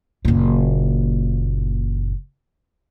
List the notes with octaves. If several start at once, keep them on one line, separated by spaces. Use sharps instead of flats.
F#1 A#2